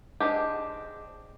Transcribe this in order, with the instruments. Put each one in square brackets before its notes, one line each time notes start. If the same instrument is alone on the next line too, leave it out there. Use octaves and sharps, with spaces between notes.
[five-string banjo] G#3 C4 D4 G4